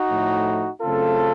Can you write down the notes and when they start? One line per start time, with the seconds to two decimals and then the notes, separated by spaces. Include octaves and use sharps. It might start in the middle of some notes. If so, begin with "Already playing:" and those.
Already playing: D#4 F#4
0.11 A2 F3 A3
0.81 F#2 C#3 A3 C4 F4 A4